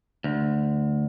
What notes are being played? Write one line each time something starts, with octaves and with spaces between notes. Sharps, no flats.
D2